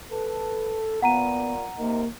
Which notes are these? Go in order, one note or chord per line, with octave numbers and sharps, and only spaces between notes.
A4 B4
A#2 B3 F#5 A#5 D#7
C3 A#3 D#4 A#4